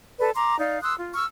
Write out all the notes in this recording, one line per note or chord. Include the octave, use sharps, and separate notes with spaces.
A4 B4 D5
A#5 C6 D6
D#4 D5 F5
C6 D#6 E6 F#6
F4
C#6 E6 F6